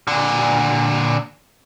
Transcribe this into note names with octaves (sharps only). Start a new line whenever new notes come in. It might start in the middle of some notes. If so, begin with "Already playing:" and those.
A#2 D3